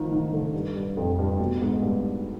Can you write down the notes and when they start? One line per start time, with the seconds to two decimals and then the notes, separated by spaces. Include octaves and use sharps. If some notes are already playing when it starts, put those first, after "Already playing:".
Already playing: D#3 F3
0.11 D#3
0.33 D3
0.54 G2
0.75 G2
0.97 F2
1.19 G2
1.40 B2
1.61 G#2
1.82 G2